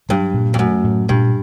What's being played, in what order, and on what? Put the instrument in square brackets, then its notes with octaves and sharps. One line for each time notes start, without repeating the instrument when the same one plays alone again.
[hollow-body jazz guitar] G2 [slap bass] F#3
[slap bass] A#2
[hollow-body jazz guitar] F2
[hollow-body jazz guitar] F#2 [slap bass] A3
[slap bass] A2
[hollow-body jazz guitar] G2 [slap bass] A#2